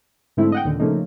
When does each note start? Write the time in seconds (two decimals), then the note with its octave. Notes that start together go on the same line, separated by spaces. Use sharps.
0.37 G#2 D3 A3 C4 E4
0.52 D#5 F#5 G5
0.64 D#2 A#2 D3
0.80 C#3 F3 A3 A#3 C#4 D#4